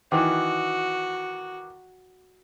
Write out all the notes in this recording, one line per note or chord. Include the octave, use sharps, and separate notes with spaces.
D#3 E3 F#4 D6